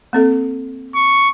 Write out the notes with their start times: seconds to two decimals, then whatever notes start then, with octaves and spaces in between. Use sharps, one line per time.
0.13 A#3 C4 A4
0.95 C#6